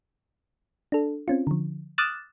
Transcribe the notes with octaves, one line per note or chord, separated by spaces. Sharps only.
D4 A4
C4 C#4 F4
D3 F3
D6 D#6 F6 F#6 A6 E7